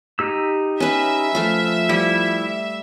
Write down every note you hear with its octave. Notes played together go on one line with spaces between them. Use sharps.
D#4 G4 E6
C#4 B4 E5
F3 A3 F5
G3 E4